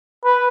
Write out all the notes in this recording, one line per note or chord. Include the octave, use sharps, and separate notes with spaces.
B4